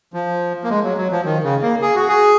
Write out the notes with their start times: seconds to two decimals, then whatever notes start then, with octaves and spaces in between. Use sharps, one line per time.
0.14 F3
0.64 A#3
0.70 G#3
0.84 F#3
0.98 F#3
1.12 F3
1.25 D#3
1.43 C#3
1.62 A#3
1.82 G#4
1.95 F#4
2.08 G#4